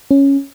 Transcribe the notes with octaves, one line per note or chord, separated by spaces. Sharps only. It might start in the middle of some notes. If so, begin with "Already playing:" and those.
C#4